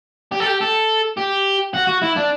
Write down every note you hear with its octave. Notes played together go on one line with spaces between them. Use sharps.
G4
A4
G4
A4
G4
F#4
F#4
E4
D4